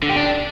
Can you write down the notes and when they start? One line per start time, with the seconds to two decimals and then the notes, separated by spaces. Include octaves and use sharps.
0.02 D3
0.09 G4
0.16 D4